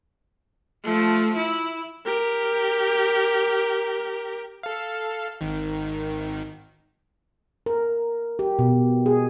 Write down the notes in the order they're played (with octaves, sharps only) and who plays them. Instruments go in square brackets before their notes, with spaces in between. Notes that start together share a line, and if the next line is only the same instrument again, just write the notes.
[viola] F3 A3
E4
G4 A#4
[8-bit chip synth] A4 F5
G#1 D#3
[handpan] A#4
G4
B2
G#4